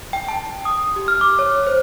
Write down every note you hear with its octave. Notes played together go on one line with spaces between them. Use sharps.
G5
A5
D#6
G4
F6
D6
C#5
C5